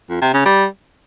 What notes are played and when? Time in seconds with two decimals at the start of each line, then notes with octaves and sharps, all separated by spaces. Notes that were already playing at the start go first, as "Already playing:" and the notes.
0.09 F2
0.21 C3
0.33 C#3
0.45 G3